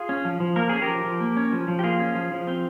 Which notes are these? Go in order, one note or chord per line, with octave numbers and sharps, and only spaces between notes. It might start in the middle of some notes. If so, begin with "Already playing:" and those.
Already playing: F4 G#4
C#4
F3
F3
A#3 A#4
C#4 G#4
G4 A#4
F3
F3
A#3
C#4
F3
F3
G4
A#3 F4 G#4
C#4
F3
F3
C4